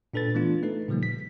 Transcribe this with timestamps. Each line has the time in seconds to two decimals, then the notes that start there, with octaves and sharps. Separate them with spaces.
0.14 A#2 D4 A4 B4 A6
0.35 E3 A3 B3 D4 F4
0.63 A3 D#4 A4 B4
0.88 A#2 C#3 F3 G3 A#3
1.03 B6